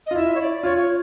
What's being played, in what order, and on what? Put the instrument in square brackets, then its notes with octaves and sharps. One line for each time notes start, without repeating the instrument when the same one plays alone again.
[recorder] D#5
[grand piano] F4
[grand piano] E4 [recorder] E5
[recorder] C#5
D5
[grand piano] F4 [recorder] C#5
[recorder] C#5